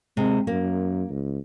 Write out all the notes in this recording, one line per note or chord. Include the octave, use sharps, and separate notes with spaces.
C3 G#3
F#2 A#3
C#2